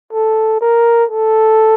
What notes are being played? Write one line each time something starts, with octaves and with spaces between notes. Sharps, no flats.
A4
A#4
A4